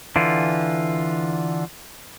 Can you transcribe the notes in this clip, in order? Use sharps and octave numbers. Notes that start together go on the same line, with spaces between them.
D3 E3 F4